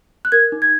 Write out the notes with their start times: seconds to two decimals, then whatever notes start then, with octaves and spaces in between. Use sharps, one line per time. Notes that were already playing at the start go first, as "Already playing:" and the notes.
0.25 F#6
0.32 A#4 G#6
0.52 D#4
0.62 G#6